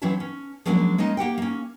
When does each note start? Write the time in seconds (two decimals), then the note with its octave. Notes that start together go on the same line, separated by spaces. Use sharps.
0.02 E3 F#3 C4 C#4 E4 A5
0.20 C#4
0.66 F3 F#3 G#3 A#3 C#4 D4
0.98 G#3 A#3 C#4 D#4
1.17 A#3 G4 F#5 G5
1.38 A#3 C#4